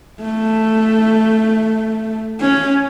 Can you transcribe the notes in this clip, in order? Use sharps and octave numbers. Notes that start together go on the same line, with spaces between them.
A3
C#4